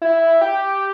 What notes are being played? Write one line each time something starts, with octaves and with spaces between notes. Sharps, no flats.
E4
G4